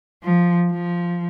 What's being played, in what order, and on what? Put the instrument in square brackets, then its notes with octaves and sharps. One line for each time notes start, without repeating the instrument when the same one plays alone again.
[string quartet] F3
F3